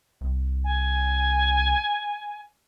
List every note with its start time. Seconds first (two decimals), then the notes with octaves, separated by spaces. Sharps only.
0.21 C2
0.64 G#5